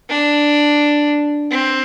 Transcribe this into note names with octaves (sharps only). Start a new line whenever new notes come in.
D4
C4